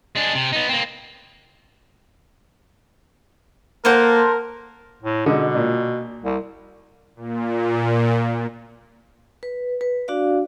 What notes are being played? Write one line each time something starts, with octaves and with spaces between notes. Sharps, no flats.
G#3 D4
C3
B3 D#4
A#3 C4
A#3 A4 A#4 C5 F#5
A2
B2 D3 G#3 D#4
A#2 D4
C2
A#2
B4
B4
D4 F#4 D5 F5